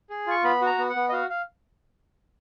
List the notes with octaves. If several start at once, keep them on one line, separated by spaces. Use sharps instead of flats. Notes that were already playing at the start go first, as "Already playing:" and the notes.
G#4
F4 C#6
B3 B5
F#4 A#5
B3
F#5
B3
D#5
F#4 F5
F5